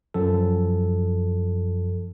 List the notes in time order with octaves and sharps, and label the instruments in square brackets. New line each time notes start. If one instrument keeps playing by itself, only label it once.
[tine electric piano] F#2 F3 A4